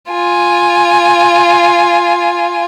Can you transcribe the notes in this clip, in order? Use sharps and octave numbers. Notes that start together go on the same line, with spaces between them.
F4 G#5